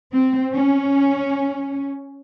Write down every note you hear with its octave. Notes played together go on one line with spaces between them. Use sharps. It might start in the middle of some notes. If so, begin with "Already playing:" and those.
C4
C#4